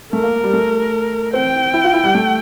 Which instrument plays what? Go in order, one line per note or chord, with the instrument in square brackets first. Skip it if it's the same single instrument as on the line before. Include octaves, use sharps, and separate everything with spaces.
[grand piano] A3 [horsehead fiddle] A#4
[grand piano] A#3
G3
A3
[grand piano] C4 [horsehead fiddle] G5
[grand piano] E4
F4
E4
G3
A3